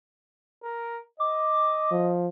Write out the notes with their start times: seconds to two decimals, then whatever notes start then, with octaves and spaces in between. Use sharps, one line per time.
0.64 A#4
1.20 D#5 D6
1.91 F3